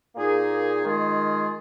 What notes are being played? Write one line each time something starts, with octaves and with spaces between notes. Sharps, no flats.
A#2 A#3 D#4 G#4
D#3 G#3 F4 G#4